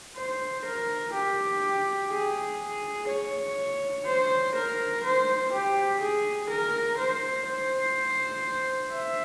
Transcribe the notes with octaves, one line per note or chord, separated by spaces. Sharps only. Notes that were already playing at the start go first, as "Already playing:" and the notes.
C5
A#4
G4
G#4
C#5
C5
A#4
C5
G4
G#4
A#4
C5
C5
E5